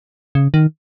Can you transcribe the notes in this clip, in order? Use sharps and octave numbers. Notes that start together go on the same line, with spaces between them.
C#3
D#3